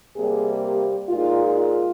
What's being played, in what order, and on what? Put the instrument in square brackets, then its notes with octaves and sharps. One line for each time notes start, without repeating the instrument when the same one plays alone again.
[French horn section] C3 G3 A#3 G#4
G4
A#2 G#3 D#4 F4
F4